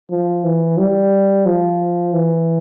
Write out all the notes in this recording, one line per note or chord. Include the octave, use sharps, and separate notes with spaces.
F3
E3
G3
F3
E3